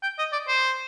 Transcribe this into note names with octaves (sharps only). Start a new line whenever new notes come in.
G5
D#5
D5
C5